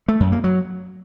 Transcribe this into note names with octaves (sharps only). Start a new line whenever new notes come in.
A3
F#2
A#3
F#3